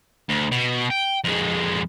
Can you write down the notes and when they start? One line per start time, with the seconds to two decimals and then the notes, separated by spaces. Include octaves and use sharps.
0.29 D2
0.51 B2
0.90 G5
1.24 F2 G#3